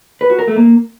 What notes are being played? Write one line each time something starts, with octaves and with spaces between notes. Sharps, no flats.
B4
F#4
A#4
A3
A#3